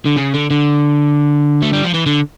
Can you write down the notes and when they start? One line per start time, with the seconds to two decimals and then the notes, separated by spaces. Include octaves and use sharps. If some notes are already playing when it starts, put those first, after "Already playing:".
0.06 D3
0.17 C#3
0.34 D3
0.50 D3
1.62 A3
1.73 G3
1.84 F3
1.94 E3
2.06 D3